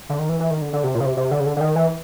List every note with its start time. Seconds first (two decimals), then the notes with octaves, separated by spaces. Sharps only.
0.09 D3
0.19 D#3
0.29 E3
0.40 E3
0.51 D#3
0.62 D3
0.73 D3
0.84 C3
0.95 A#2
1.00 C#3
1.06 C3
1.17 C3
1.31 D3
1.40 C#3
1.46 D3
1.56 D3
1.61 D#3
1.76 E3